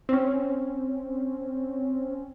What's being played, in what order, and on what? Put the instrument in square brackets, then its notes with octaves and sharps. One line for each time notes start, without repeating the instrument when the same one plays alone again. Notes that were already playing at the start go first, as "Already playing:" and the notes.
[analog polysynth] C4 C#4